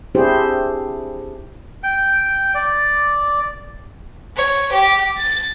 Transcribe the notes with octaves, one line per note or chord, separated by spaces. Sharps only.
C4 D4 E4 G4 G#4 C5
G5
D5
C#5
G4
A6